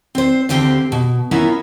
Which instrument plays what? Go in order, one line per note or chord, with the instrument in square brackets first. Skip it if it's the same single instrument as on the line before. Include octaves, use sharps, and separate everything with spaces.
[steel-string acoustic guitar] C4 C5
D2 D3 C4 G4 C5 F5
B2
B3 C#4 E4 F4 A#4 E5